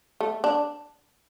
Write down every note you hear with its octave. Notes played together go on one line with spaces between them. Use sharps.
A3
D4